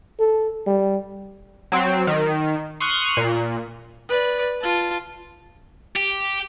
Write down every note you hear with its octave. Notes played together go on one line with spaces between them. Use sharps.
A4
G3
F#3 C4
D#3
C6 C#6 D#6 F6 F#6
A#2
B4 D5
F4 A5
G4